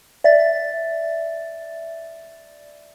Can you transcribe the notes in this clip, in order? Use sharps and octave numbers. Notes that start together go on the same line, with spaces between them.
D5 E5 A6